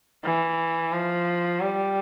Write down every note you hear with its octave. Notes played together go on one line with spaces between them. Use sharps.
E3
F3
G3